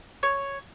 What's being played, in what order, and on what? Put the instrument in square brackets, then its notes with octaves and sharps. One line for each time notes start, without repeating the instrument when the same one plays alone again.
[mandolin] C#5